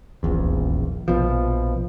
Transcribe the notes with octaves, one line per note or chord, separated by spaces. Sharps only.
D#1 A#1 E2
A#1 B2 F3